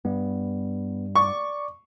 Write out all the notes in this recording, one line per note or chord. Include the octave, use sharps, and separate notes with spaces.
G2 B3
D5 C#6 D6